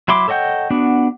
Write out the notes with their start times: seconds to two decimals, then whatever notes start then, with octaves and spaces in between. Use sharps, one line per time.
0.08 F#3 E4 B5 C6 D6
0.28 A4 C#5 D#5 F#5 G5
0.70 B3 D4 F#4